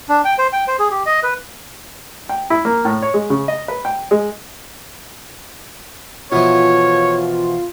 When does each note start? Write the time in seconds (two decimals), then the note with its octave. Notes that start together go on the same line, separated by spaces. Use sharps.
0.09 D4
0.25 G5
0.38 C5
0.53 G5
0.67 C5
0.79 G#4
0.91 G4
1.06 D#5
1.23 B4
2.29 G5
2.50 E4
2.65 A#3
2.85 A2
3.02 C#5
3.14 G#3
3.30 C#3
3.48 D#5
3.68 B4
3.85 G5
4.11 G#3
6.32 B2 E3 F3 F4 C#5